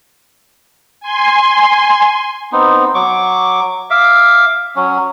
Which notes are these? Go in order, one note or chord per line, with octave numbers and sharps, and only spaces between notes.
G#5 C6
B3 C4 D#4
F#3 C#6 D6
E5 F5 D6
F#3 C#4